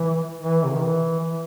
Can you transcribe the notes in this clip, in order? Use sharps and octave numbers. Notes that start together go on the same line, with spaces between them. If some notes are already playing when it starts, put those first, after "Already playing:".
Already playing: E3
E3
C3
D#3
E3
E3